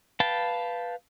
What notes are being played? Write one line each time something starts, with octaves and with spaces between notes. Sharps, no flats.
B4 F5 G5 A5